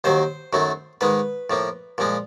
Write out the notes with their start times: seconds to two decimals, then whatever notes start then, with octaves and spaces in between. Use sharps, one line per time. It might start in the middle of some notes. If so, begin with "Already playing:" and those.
0.04 D#2 D#3 F#3 C5
0.53 F#2 D#3 F#3 A3
1.01 G#2 D#3 G#3 B4
1.50 A2 F3 A#3
1.98 A#2 F3 G#3